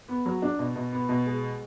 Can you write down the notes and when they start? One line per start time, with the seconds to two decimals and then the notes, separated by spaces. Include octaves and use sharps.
0.08 B3
0.26 F#3
0.42 D4
0.59 B2
0.76 B2
0.92 B3
1.09 B2
1.26 G#3